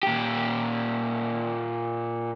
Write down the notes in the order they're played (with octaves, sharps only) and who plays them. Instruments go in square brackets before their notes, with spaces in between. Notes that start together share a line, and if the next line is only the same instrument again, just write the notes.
[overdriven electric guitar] A#2 G4